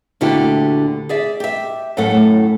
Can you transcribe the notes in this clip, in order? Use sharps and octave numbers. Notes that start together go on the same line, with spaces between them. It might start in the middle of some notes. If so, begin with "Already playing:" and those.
D2 A#2 D3 E4 F#4 G4
G#4 D5 E5
G4 E5
F#2 A2 A3 A4 F#5